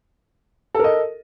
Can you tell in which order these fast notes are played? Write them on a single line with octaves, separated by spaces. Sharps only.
A4 A#4 D#5